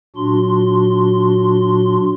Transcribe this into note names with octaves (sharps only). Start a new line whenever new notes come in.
A#2 F#3 D4 F#4 C6